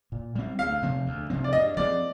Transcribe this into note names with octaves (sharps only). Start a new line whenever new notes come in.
A#2
G3 C4
D2 F5
C3 F3 C4
D2
C3 F3 C4
D5
G2 D#5
F3 C4 D5